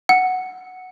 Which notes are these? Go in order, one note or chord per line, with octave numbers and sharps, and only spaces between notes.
F#5